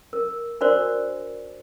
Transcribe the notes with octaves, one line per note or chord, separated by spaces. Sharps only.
A#4
D4 F#4 A#4 C5 D5